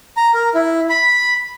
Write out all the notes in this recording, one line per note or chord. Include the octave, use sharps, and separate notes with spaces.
A#5
A#4
E4
B5